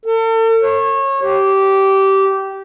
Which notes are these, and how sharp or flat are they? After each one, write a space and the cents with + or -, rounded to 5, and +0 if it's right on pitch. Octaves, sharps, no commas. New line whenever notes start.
A4 +40
C#5 -25
G4 -15